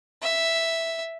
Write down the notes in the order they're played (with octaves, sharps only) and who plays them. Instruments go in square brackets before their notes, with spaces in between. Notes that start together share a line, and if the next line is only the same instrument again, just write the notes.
[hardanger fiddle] E5